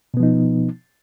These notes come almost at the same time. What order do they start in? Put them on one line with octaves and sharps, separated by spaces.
B2 B3 F3 D#4